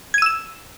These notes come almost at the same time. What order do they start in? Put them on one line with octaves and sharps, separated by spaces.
G#6 D#7 E6 E7